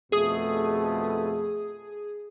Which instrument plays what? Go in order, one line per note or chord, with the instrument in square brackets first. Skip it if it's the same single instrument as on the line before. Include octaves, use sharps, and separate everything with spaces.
[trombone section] F2 B2 A3 [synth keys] G#4 D#6